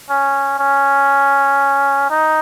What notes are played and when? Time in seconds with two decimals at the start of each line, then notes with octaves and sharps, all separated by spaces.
0.10 C#4
0.59 C#4
2.10 D#4